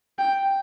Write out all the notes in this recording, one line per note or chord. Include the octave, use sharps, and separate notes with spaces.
G5